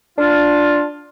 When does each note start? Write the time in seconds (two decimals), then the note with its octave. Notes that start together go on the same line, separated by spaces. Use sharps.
0.19 D4 F4